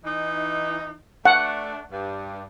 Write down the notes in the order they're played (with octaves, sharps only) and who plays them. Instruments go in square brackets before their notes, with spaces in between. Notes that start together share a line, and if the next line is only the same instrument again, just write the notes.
[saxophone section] E3 D#4
[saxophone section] A3 D4 [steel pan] F#5
[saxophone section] G2